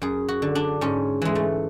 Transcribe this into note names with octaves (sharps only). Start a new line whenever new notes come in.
F#2 G#4
F#4
D3
D4
G#2 C#4
E3 G#3
A3